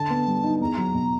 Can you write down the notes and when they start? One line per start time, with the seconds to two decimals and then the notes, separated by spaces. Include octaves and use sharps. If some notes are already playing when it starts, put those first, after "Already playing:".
Already playing: D3 A5
0.10 B3
0.27 G3
0.44 D#4
0.61 E2 A#5
0.77 F#3
0.94 B2